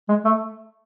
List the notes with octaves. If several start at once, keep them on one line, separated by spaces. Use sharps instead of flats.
G#3
A3